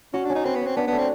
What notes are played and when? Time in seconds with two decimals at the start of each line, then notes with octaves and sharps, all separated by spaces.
0.14 C#4 F#4
0.25 D4
0.30 C#4
0.35 D#4
0.45 C4 B4
0.55 B3
0.61 C4 C#4
0.76 B3 D4
0.87 B3
0.93 A3
0.98 C4